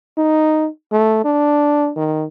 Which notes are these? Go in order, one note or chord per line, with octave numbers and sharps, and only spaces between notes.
D#4
A3
D4
D#3